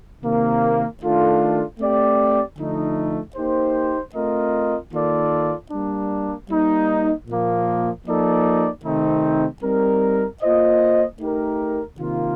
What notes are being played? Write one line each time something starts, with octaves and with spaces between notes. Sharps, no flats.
C3 D#3 A#3
D#3 A3 D4 F4 A4
A3 C4 G4 D5
D3 F3 A3 D#4
A#3 D#4 G4 C5
A3 C4 F4 A#4 D#5
D#3 A#3 F4 A4 D5
G3 A#3 D4
G3 A#3 D#4
A#2 F3 A#3
F3 A#3 D#4 A4 D5
C3 D#3 A3 C4 D#4
G3 C4 D#4 A#4
A#3 F4 C5 D#5
A3 D#4 G4 A#4
C3 D#3 A#3 F4